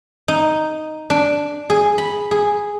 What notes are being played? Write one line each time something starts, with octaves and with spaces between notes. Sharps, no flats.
D#4
D4
G#4
B5
G#4